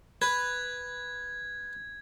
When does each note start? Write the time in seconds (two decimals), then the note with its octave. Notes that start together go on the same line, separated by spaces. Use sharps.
0.22 B4 G#6